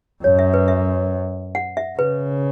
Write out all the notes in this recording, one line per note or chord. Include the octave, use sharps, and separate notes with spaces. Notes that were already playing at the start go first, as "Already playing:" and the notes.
F#2 C#5
E5
B4
E5
F#5
E5
C#3 B4